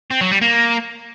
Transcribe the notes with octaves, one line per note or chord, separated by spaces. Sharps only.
C4
F#3
G3
A#3